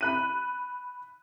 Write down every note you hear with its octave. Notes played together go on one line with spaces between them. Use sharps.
B5 F#6 D#7